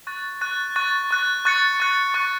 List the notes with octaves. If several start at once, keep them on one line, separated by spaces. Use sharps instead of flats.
C#6 F#6 A6
C#6 F#6 A6
C#6 F#6 A6
C#6 F#6 A6
C#6 F#6 A6 C#7
C#6 F#6 A6 C#7
C#6 F#6 A6 C#7